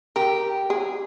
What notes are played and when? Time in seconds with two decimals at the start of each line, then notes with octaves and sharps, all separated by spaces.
0.16 G4 A#4
0.70 G#4